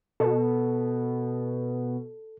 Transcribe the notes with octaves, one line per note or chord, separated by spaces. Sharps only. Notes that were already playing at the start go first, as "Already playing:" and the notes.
B2 A4